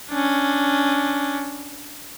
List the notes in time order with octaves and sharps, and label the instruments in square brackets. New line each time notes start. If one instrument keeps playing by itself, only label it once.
[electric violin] C#4 D4